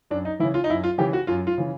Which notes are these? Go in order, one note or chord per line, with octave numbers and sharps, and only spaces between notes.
F#2 D4
D#4
C#3 E3 E4
F4
D#4
F#2 E4
F4
C#3 E3 G4
F#4
F#2 F4
F4
C#3 E3